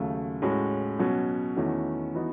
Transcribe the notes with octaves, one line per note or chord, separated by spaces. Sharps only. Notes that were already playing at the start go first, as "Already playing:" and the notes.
Already playing: D#2 C#3 F#3 A3
A2 G#3 C#4 F#4
B2 F#3 C#4 F#4
E2 D#3 A3 C#4 F#4
E3 B3 D#4 F#4